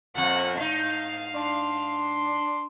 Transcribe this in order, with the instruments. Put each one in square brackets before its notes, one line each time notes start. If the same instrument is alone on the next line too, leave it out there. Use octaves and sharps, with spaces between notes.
[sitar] F2 A#2 [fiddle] F#5
[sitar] G#2 D#4 [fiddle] F5
[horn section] D4 C6